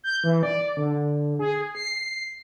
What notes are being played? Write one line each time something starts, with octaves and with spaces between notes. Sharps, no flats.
G6
E3
D5
D3
G#4
C7